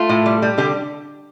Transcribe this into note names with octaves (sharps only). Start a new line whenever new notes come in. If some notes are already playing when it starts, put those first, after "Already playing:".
Already playing: A3 F4
A2
G3
G3
D3 G4